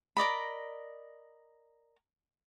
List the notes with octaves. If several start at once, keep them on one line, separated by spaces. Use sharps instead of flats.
A#4 D5 D#5 B5